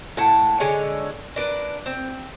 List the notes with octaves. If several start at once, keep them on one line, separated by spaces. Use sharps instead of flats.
A2 F#5 A5
D3 G#3 C#5 G#5
D4 A#4 B4
C4